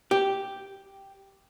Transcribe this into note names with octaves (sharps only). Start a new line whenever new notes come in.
G4